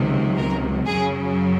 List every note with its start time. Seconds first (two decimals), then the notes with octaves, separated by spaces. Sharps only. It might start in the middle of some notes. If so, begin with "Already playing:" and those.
Already playing: C#2 C3 D#3 F#3
0.37 A#4
0.87 F#2 C#3 F#3 G#4